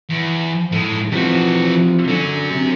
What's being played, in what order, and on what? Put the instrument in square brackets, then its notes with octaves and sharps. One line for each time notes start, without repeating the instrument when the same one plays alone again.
[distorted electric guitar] E2
A2 G#3
[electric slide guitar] C3 F3 [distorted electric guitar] E3 F#4
[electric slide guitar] D3 [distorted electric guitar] F#3 C#4
[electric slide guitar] C3